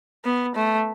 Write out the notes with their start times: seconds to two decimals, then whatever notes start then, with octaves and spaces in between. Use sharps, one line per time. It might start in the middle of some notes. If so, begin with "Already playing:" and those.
0.24 B3
0.55 A3